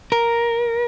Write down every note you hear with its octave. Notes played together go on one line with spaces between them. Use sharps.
A#4